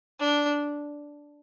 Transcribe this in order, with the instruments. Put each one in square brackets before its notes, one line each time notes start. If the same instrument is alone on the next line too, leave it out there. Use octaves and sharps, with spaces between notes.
[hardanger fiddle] D4